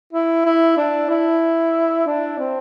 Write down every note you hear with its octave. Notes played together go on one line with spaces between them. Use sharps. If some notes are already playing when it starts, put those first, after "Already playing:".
E4
E4
D4
E4
D4
C4